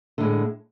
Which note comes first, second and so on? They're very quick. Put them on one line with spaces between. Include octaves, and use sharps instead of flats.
D3 A2 G#3